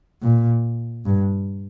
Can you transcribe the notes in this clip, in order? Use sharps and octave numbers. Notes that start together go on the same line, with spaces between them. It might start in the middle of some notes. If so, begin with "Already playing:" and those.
A#2
G2